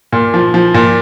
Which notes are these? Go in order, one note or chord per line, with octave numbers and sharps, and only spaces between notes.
A#2
F3
F3
A#2